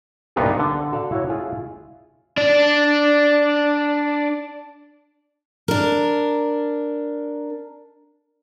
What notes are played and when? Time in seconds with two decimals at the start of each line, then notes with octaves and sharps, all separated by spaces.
0.36 C2 G2 A#2 B3 D#4 F4
0.59 D3 A5
0.92 F#4 A4 D5 F5
1.12 E4 F#4 C#5
1.30 E4 F4 G#4
2.37 D4 D5
5.68 D4 A#4